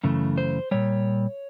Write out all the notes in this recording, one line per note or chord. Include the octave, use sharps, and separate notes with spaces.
F#2 C#3 E3 A3
C5
A#2 G3 C#5